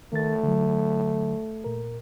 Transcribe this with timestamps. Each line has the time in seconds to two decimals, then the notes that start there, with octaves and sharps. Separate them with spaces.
0.13 D#3 A3 A#4 A6
0.43 D3 F#3
1.64 A#2 A#4